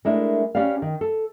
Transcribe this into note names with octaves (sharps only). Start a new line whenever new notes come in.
G#3 A3 D4 E4 A#4
C#4 G4 B4 D5 F5
D#3
A4